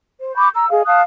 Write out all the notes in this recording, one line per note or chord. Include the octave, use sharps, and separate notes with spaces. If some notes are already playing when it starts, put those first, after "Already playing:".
C5
B5 C#6 D6 G6
A#5 E6
G#4 D#5 F5
F5 A5 D#6 F#6